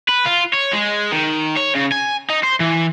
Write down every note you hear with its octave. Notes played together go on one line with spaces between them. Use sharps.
B4
F4
C#5
G#3
D#3
C#5
C#3
G#5
D#4
C5
E3